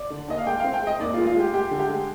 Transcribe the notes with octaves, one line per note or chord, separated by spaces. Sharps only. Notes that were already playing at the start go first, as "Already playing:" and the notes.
Already playing: D5
D3
D#2 D#5
F5
G#3 G5
C4 F5
G5
G#3 D#5
D#2 D5
F4
G#3
F4
G#3 G4
G#3 G4
D3
G4
G#3